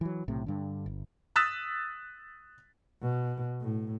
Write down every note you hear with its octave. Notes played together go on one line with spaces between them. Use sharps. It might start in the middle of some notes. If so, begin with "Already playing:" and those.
E3 F#3
B1 A2 C3
G2 D3
G1
D#6 E6 F#6 A6 B6 E7
B2
A2